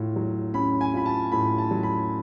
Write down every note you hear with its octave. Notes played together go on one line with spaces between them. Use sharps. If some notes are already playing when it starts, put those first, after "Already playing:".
Already playing: A2 F4
F#3
C#4 B5
G#5
F4 B5
A5
A2 B5
A5
F#3
B5